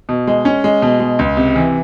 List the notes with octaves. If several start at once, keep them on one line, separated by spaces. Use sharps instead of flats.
B2
G#3
C#4
G#3
B2
G#3
C#2
C3
E3